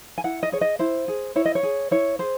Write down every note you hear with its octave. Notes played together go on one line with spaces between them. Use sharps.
G#5
E4 F#5
D#5
G#4 C#5
D#5
E4 C5
G#4
E4 C#5
D#5
C#5
G#4
E4 C#5
G#4 C5